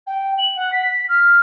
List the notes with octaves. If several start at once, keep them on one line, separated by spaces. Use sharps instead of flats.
G5
F#7
F#5
B6
F6